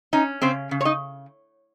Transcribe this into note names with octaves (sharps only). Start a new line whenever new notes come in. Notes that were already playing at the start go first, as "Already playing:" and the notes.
C#4 D#4
C#3 C4 C5
C#3
C#5
D#4 D#5